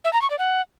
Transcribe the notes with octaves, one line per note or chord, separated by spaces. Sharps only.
E5
A#5
C#6
D5
F#5